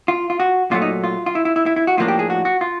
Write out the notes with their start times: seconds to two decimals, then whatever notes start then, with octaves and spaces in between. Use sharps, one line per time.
0.08 F4
0.30 F4
0.40 F#4
0.71 A#2 F#3 A3 F4
0.82 D#4
1.04 F4
1.26 F4
1.35 E4
1.45 E4
1.56 E4
1.66 E4
1.76 E4
1.87 F#4
1.97 A2 F3 A#3 D4 F4
2.08 G4
2.19 G#4
2.30 F#4
2.45 F#4
2.61 F4